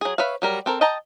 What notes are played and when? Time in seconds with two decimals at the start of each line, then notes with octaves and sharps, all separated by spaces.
0.01 F#3 G#4
0.18 B4 C#5 E5 F5
0.42 F#3 G3 A#4
0.66 C4 A4 A#4
0.81 D#5 G5 A5 A#5